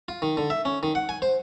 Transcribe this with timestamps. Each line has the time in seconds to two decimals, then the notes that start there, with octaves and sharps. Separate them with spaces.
0.08 F4
0.22 D#3
0.37 D3
0.50 E5
0.65 C#4
0.83 D#3
0.95 F#5
1.09 G#5
1.22 C5